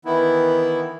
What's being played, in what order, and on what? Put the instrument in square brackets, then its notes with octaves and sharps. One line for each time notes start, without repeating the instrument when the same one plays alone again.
[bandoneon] D#3 E3 B3 E4